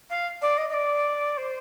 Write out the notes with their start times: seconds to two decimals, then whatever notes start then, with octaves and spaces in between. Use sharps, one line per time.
0.09 F5
0.41 D5
0.57 D#5
0.69 D#5
0.73 D5
1.37 C5